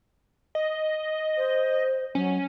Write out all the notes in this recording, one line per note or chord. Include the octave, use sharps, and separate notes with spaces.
D#5
C5
F#3 C#4